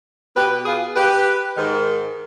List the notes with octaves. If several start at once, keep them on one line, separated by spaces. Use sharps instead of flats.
B2 G4 B4
F4 G#4
G4 B4
G#2 D#3